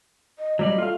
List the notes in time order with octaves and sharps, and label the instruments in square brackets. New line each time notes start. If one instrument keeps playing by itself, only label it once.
[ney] D#5
[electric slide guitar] F#3 G3 D5 [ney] D#5
[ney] A3 [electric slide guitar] F4 F5